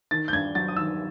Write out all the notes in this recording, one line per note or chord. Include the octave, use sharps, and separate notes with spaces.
D#3 A6
G6
G2 G#6
F#3 A6
D#6
D#3 E6